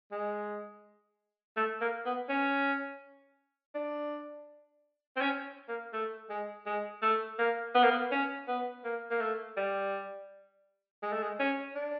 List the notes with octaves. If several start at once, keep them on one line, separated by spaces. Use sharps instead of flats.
G#3
A3
A#3
B3
C#4
D4
C4
C#4
A#3
A3
G#3
G#3
A3
A#3
B3
A#3
B3
C#4
B3
A#3
A#3
A3
G3
G#3
A3
G#3
C#4
D4